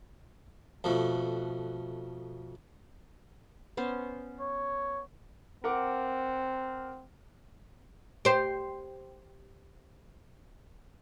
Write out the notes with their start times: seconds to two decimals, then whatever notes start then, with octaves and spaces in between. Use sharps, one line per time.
0.84 F2 B2 F3 A3
3.77 B3 C#4 C5
4.40 C#5
5.64 C4 A#4 F#5 D6
8.25 G4 C5